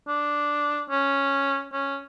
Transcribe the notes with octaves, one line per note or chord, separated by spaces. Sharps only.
D4
C#4
C#4